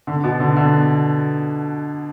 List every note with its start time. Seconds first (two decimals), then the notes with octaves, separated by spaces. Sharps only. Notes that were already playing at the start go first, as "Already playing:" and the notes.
0.07 D3
0.24 B2
0.40 D3
0.57 D3